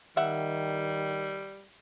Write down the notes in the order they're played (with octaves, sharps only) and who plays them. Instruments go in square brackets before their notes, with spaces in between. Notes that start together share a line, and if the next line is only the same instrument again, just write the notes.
[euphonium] D#3 [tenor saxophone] G3 [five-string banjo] E5 F#5